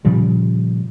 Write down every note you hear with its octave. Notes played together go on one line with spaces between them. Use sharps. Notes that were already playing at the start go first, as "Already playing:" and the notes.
A#2 C#3 F3 G3